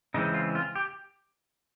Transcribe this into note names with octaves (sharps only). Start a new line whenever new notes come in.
C#3 E3 G#3 C4 D#4
F4
F4
G4